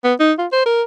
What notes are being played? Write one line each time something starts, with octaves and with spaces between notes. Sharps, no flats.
B3
D#4
F4
C5
A#4